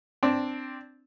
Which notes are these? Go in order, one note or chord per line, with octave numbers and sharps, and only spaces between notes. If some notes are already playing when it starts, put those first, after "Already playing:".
C4 D4